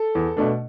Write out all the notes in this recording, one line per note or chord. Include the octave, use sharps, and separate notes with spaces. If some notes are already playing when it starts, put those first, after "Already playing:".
Already playing: A4
E2
B2 A3 D4